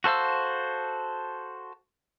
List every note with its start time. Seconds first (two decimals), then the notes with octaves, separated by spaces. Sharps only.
0.04 F#4 A4 C5 F5 E6